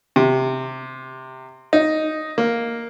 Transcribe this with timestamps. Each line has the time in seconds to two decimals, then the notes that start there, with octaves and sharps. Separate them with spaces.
0.16 C3
1.73 D#4
2.38 A#3